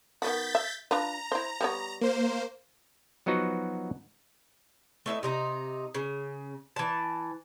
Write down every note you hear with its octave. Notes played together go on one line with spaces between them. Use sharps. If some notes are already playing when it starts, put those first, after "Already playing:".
D#3 B3 F#4 G6 A6 B6
E5
D4 F4 B4 A#5
E4 C5
G3 B3 C#5
A#3 C5
F3 F#3 B3 D#4 F#4 B4
A3 E4 D#5 E5
C3 D#4 A#5
C#3
E3 A5